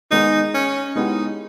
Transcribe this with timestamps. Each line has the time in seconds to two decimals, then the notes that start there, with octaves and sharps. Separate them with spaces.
0.11 D#3 G#3 B3 D#4
0.54 C#4
0.96 G#3 B3 D#4 E4 G4